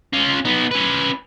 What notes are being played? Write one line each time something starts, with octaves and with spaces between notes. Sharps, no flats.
C#4 F4
B3 D#4
C#4 B4